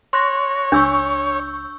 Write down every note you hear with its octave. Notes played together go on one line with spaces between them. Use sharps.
C#5 C6 F#6 A#6
C#2 D4 C#6 E6 G6